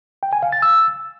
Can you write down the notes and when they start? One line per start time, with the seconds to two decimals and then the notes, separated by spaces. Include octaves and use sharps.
0.23 G5
0.33 G#5
0.43 F5
0.52 A6
0.62 E6